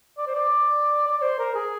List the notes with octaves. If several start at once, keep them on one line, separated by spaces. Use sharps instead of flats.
D5
C5
D5
D5
C5
A#4
G#4